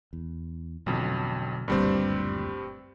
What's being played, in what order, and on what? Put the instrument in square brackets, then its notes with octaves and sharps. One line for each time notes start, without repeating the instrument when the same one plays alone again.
[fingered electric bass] E2
[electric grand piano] A1 F2 [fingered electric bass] B2 D3 F#3
[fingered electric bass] F#1 D2 A#2 [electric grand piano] G2 G3 C4